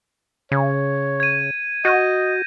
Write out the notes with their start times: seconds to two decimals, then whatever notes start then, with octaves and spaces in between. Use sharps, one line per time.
0.52 C#3 C#5
1.20 G#6 D#7
1.85 F#4 D#5 G6 A#6 D#7